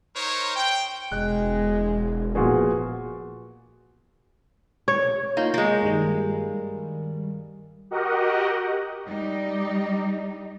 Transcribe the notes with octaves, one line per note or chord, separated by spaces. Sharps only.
D#4 A#4 C5 C#5
G5
E1 G#3 F#6
A#2 F3 B3 F#4 G#4
C#5
A#3 D#4 F4 G6
G#3 A#3
G2 D#3 G3
F#4 G4 A#4 D#5 F#5
G3 D#4